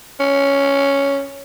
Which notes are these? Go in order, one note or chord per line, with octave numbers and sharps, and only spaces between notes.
C#4